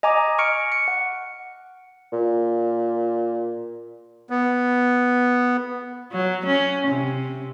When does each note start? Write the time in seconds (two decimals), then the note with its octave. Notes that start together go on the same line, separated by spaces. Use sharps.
0.03 D#5 G#5 A#5 D6
0.39 C#6 F6 C#7 D7
0.72 C#7
0.88 F#5
2.12 A#2
4.30 B3
6.12 F#3
6.46 C#4
6.87 C3